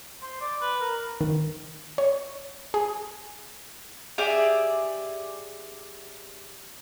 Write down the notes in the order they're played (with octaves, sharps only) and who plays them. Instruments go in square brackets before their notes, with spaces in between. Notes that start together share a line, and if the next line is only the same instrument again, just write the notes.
[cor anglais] C5
D5
B4
A#4
[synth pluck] D#3
C#5
G#4
[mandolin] G4 G#4 D5 E5